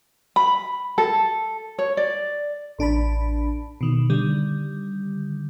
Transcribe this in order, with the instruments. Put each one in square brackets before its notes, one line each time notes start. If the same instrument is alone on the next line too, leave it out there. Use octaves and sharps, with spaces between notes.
[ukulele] B5
A4
C#5
D5
[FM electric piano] A1 D4 A5 B5
B2 D#3
D3 D#3 G3